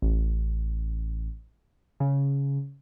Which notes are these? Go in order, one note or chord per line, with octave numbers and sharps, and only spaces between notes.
A1
C#3